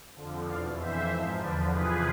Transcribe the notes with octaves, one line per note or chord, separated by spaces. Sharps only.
F2 D3 F3
E2 B2 D5 F5
F2 E3 C5 E5
G#2 F3
E2 D3 F3 B4 D5
E2 C3 F3 G#4 B4